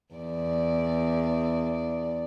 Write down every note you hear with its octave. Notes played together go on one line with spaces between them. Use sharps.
E2 D5